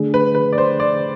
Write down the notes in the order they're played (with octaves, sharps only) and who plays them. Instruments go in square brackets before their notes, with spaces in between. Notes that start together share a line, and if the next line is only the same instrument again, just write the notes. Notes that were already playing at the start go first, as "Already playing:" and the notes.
Already playing: [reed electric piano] D3 A3 D4 G#4
[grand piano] B4
B4
D5
C5
D5